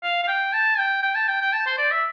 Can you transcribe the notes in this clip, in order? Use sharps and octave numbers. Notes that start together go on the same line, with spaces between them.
F5
F5
G5
A5
G5
G5
A5
G5
G5
A5
C5
D5
E5